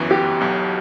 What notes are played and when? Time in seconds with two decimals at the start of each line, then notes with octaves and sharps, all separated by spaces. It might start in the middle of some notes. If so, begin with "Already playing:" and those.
Already playing: G1 F#2 E3 B3 F#4
0.11 G4
0.41 B1 B2 F#3